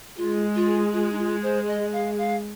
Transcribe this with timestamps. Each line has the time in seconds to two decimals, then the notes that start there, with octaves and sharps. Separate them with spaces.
0.17 G#3 F4
0.55 F4
0.93 F4
1.12 D#4
1.18 F4
1.43 C5
1.68 D#5
1.92 F5
2.18 F5